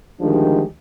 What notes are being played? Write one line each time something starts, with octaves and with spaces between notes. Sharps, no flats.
D2 D#3 F3 G#3 D4 G4